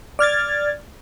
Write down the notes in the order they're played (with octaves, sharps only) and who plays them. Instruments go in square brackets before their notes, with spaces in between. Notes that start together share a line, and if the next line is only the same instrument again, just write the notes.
[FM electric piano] D5 F6 G#6 A6